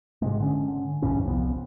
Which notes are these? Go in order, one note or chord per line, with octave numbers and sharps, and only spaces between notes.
G#2 C3 G#3
D3 C#4
E1 A#1 G2 C#4
C2 F3 B3